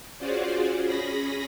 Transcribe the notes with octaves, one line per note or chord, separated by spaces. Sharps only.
C#4 F4 F#4 G#4 C5 D5
C#4 G#4 B5 A#6